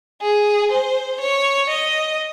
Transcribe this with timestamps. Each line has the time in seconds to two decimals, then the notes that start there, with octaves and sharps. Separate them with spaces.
0.22 G#4
0.71 C5
1.21 C#5
1.70 D#5